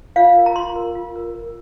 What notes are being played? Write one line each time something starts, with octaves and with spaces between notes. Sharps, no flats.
F4 F5
A#4
A#5
F4 C6
A#4
F4
A#4
A#4